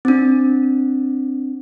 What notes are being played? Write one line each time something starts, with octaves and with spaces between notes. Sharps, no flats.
C4 D4